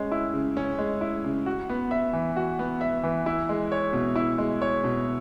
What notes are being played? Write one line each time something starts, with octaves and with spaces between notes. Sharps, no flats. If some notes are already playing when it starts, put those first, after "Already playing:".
Already playing: G#3 C#4
E4
C#3
C#4
G#3
E4
C#3
F#4
B3
E5
E3
F#4
B3
E5
E3
E4
G#3
C#5
B2
E4
G#3
C#5
B2